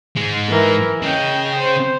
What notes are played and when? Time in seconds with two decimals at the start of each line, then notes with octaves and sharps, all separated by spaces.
0.16 G#2 G#3
0.49 E3 A#4
1.02 C#3 D#5 G5
1.59 C5